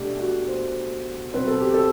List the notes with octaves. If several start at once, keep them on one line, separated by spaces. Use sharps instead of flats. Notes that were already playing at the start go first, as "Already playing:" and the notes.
Already playing: B2 A3 D4 G4
F#4
C5
B2 F#3 C4 B4
A4
G4
A4